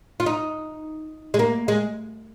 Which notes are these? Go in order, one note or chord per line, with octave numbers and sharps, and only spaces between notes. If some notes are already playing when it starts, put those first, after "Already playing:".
F4
D#4
G#3
A#3
G#3